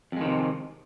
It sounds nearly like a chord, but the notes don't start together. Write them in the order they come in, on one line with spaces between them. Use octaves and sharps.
F2 G#3 D#3 C3